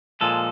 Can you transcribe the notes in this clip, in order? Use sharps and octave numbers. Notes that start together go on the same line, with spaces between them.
A#2 F3 G#3 A4